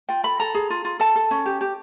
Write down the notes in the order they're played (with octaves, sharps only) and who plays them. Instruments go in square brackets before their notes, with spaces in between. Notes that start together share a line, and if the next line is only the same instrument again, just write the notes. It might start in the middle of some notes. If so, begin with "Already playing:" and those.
[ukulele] F4 G5
A4 B5
A4 A#5
G#4
F4
F4
A4 A5
A4
C#4
G4
G4